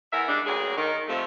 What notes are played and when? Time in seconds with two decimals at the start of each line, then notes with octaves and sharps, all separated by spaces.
0.12 E2 A#4 E5
0.27 G3 G#3 D4
0.45 D2 F#3 A#3 G#4
0.76 D#3
1.07 C3 F3 A3